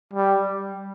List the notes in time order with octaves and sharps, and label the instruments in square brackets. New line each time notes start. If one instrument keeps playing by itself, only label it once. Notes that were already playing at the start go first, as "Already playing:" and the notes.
[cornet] G3